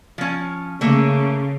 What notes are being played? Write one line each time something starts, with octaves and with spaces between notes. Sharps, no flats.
F3 C#4
C#3 A3 A#3